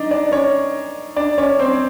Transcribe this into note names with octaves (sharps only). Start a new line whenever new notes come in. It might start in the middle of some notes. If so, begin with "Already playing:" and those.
Already playing: D4 D#4 D5 D#5
D4 D5
C#4 C#5
D4 D5
C#4 C#5
C4 C5